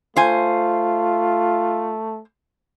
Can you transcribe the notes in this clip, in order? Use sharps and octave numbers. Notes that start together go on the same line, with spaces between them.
A3 F4 C5 G#5